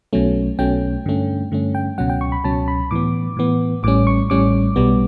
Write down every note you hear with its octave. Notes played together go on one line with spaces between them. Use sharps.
B1 B2 F#3 A3 C#4
B1 B2 F#3 A3 C#4 G5
G2 D3 A3 C#4
G2 D3 A3 C#4
G5
C#2 B2 F#3 C#4 F#5
G5
C#6
B5
C#2 B2 F#3 C#4 A5
B5
A2 E3 B3 D6
A2 E3 B3
A1 A2 G3 C#4 D6
C#6
A1 A2 G3 C#4 D6
B1 B2 G3 B3